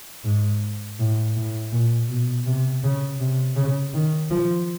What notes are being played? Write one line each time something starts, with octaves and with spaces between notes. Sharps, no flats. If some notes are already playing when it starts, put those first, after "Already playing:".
G#2
A2
A2
A#2
B2
C3
C#3
C3
C#3
D#3
F3